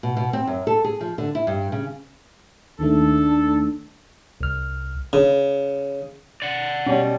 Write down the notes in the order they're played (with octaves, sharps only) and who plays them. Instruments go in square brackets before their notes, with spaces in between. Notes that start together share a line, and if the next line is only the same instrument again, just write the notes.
[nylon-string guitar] B2
B2
C4
F#2
A4
G#4
F3
D3
E4
G2
C#3
[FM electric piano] D#2 D#3 A3 [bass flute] D4 [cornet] A4
[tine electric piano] C2 F6
[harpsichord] C#3
[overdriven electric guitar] D5 F#5
[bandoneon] B2 G3 [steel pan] C#4